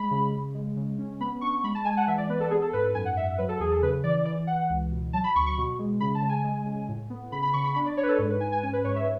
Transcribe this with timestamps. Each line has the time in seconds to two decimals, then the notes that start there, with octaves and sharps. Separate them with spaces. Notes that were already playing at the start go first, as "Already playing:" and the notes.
Already playing: G#3 B5
0.11 C#3
0.32 C#3
0.54 G#3
0.76 C#3
0.98 C#4
1.20 B3 B5
1.41 D4 C#6
1.63 G#3 B5
1.75 A5
1.85 G#3 G#5
1.97 F#5
2.07 E3 E5
2.18 D5
2.29 B3 B4
2.40 A4
2.51 B3 G#4
2.62 A4
2.73 G#2 B4
2.95 F#2 G#5
3.05 F#5
3.17 F#2 E5
3.38 F#3 B4
3.49 A4
3.60 E2 G#4
3.72 A4
3.82 C#3 B4
4.04 E3 D5
4.26 E3 D5
4.47 E3 F#5
4.69 C#2
4.91 B2
5.13 F#3 A5
5.24 B5
5.35 D2 C#6
5.46 C#6
5.58 B2
5.79 G#3
6.00 C#3 B5
6.15 A5
6.22 C#3
6.29 G#5
6.44 G#3
6.66 C#3
6.89 A2
7.10 B3
7.32 C#3 B5
7.42 B5
7.53 C#3 C#6
7.64 B5
7.75 D4 B5
7.86 D5
7.97 D4 C#5
8.03 B4
8.08 A4
8.19 G#2
8.30 B4
8.40 G#2 G#5
8.52 G#5
8.63 C#4 G#5
8.73 B4
8.84 G#2 C#5
8.96 E5